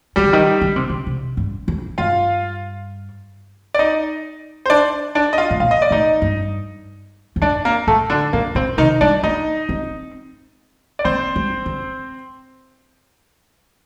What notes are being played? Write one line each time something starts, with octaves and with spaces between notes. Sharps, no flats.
D#3 G3 G4
D3
D#3
D3
C3
D3
C3
G2
F2
G2 F4 F5
D5
D#4 D#5
C5
D4 D5
D4 D5
D#5
F4 F5
A2
A#2 F5
D#5
D5
A2 D#4 D#5
G2
F2
G2 D4 D5
A#3 A#4
A2 A3 A4
D3 D4
A#2 A#3
A#2 C4
C3 D#3 D#4
G3 D4 D5
A#3 D#4 D#5
C4
D5
A#3 C4 C5
G3
D3